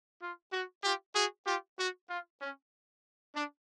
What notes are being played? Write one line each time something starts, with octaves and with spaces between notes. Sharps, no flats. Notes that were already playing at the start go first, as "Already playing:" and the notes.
F4
F#4
F4 G4
F#4 G#4
F4 G4
F#4
F4
C#4
D4